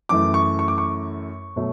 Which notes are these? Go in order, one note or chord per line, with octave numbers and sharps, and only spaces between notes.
F#2 E3 A3 D6
C#6
C#6
D6
C#6
B2 F#3 A3